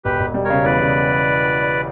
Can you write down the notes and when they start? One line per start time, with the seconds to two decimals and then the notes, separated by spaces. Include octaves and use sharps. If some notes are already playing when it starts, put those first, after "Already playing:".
0.05 E1 G4 B4
0.19 E1
0.34 G3
0.44 A#4 C#5
0.50 C#3
0.64 E2 B4 D5
0.80 C#3